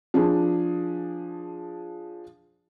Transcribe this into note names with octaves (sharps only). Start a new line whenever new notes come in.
F3 D4 G#4